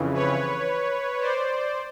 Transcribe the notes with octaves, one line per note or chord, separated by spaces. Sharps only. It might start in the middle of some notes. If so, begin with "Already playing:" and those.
Already playing: F2 C#3 E3
B4 C#5
C5 D5